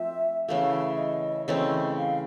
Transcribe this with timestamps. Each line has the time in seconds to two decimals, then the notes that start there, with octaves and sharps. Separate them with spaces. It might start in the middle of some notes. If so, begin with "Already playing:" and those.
Already playing: F3 A3 C4 E5
0.48 C#3 E3 A3 F5
0.73 E5
0.98 D#5
1.48 C#3 E3 A3 C4 D#5
1.97 F5